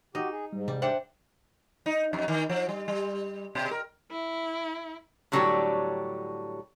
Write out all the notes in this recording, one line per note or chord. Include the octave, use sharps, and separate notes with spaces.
D#4 F#4 G4
G#4
G#2 G3
C3 G3
D4 G4 C5 E5 F#5 G5
D#4
F2
D#3
F3
G3
G3
B2
A#4
E4
A2 D3 F#3 G3 G4 C#5